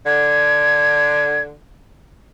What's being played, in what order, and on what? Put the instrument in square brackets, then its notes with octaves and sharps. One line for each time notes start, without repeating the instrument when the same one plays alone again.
[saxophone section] D3 [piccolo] G#6